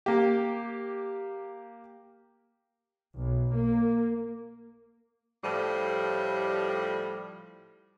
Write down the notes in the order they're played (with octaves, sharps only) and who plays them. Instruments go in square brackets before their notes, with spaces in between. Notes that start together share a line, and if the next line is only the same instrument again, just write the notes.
[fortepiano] A#3 G4
[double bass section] B1
A#3
[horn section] A2 F3 G3